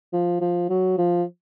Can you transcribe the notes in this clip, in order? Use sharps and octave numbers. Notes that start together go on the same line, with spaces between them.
F3
F3
F#3
F3